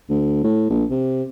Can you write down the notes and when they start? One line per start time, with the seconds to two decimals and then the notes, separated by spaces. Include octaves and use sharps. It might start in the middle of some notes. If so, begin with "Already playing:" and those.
0.10 D2
0.44 A2
0.70 A#1
0.90 C3